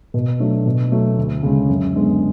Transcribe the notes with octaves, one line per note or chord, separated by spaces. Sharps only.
B2
F#3 A3 D4
B2
F#3 A3
D2
C#3 G#3 C#4
F#2
D3 G#3 B3